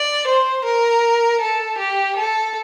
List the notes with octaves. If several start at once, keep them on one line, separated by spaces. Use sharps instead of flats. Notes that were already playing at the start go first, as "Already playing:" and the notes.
Already playing: D5
C5
A#4
A4
G4
A4